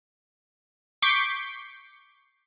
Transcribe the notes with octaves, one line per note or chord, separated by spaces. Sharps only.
C#6 D6 G6 B6 C7